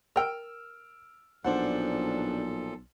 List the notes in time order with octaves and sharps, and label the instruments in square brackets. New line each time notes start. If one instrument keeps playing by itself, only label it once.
[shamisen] A#4 G5 [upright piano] E6 F6 D7
[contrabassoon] B1 [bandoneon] A#2 F3 A4 [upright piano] D4 C5 F#5